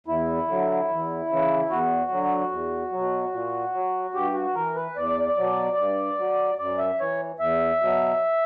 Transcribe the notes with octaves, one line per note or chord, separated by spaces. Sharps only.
E2 E4
D3 F#3
E2
C#3 E3
E2 F#4
D3 F#3
E2
B2 F#3
A#2
F#3
G2 G4
F#4
E3 A#4
B4
E2 D5
B2 F#3
G2
F#3
F#2 D5
E5
E3 C#5
E2 E5
B2 F#3